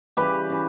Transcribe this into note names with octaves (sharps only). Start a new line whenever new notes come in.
C#3 E3 G3 G4 B4
C#3 E3